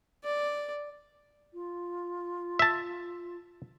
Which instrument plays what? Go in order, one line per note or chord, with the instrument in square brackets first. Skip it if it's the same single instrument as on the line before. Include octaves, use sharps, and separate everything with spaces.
[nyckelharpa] D5
[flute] F4
[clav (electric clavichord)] E5 A5